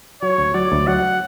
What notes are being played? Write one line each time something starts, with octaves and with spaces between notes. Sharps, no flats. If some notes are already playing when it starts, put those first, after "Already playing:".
F#3 C#5
D2
F#3 D5
D2
F#3 F#5